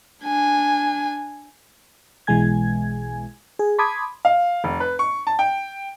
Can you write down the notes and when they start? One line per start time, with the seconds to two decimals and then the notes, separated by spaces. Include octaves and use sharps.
0.23 D4 G#5
2.27 B1 B2 E3 G#3 G#5 G#6
3.59 G#4
3.78 A5 B5 C6 D6 D#6 G#6
4.25 F5
4.64 F1
4.80 B4
4.99 C#6
5.27 A5
5.39 G5